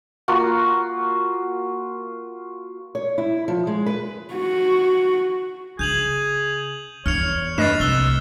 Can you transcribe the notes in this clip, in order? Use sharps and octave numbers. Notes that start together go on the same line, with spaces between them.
A#3 F4 F#4
C#5
E4
F3
G#3
B4
F#4
C#3 G#4 G6 F7 F#7
E2 C#5 F6 C#7 F7
G2 A3 B4 D#5 A6 C7 E7
C2 E6 F#6 A6 G7